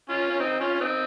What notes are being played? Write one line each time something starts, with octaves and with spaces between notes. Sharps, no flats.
C#4 F4
C#4
C4 D#4
C#4 F4
C#4
C4 D#4